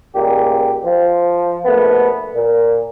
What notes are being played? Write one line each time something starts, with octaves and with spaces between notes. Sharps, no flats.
C#2 A#2 G4
F3
A#1 A3 B3
A#2